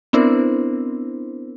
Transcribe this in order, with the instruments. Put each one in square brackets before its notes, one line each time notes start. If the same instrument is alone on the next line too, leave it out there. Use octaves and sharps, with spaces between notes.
[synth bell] B3 C4 D4 E4 A#4 C5